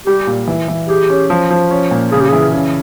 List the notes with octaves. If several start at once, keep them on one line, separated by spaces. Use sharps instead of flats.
G3 G4
A#2
E3
E3
G4 G#4
C#4
F3
F3
C#4
A#2
C#3 G#4
G4
E3 G#4
C#3